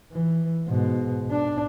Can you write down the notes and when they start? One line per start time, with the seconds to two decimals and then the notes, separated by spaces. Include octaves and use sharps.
0.13 E3
0.67 G#2 B2
1.31 D4